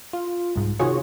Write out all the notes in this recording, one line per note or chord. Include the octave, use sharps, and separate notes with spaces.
F4
C2 G#2
C3 D#3 F4 F#4 G#4 C#5